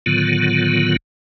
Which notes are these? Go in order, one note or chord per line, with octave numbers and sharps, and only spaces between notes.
A2 D3 D#3 F#3 B3 F4